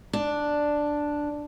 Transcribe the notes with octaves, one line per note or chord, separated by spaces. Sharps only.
D4